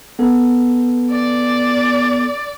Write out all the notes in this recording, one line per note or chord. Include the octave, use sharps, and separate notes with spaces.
B3 A4
D5